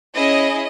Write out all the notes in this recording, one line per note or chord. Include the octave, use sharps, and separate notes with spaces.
C#4 E4 G#4 D#5